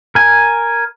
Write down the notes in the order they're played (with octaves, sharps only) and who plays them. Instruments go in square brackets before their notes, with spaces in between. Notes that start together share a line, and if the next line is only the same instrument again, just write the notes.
[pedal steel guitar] A#4 G#5